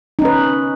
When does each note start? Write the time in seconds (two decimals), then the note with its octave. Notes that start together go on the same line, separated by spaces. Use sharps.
0.19 D#4
0.22 C#4
0.25 B4